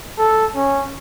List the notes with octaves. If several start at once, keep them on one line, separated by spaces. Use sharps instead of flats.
A4
C#4